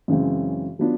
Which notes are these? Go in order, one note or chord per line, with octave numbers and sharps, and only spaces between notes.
F#2 C#3 E3 G#3 C4
F#3 B3 D4 F4